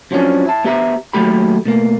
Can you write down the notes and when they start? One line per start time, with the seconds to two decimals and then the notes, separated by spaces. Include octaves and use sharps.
0.11 F2 F3 F#3 A3 C#4 D4
0.45 E4 A5
0.65 B3 G4 E5 A#5
1.13 D#2 A#2 F#3 A3 G4 B5
1.65 B2 A3 A#3